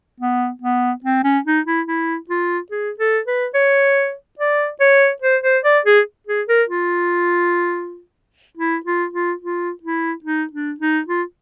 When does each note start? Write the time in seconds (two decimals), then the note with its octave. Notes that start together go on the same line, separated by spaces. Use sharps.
0.20 B3
0.62 B3
1.05 C4
1.24 C#4
1.46 D#4
1.67 E4
1.88 E4
2.30 F4
2.71 G#4
3.00 A4
3.27 B4
3.55 C#5
4.39 D5
4.81 C#5
5.22 C5
5.44 C5
5.65 D5
5.86 G#4
6.27 G#4
6.49 A#4
6.69 F4
8.58 E4
8.86 F4
9.13 F4
9.41 F4
9.84 E4
10.25 D#4
10.53 D4
10.81 D#4
11.08 F4